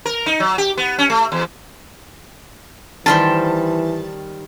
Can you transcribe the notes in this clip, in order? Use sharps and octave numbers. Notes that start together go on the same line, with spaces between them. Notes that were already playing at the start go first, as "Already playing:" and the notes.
A#4
D#4
F#3
G4
B3
C#4
A3
E2
D#3 E3 G3 C5 A5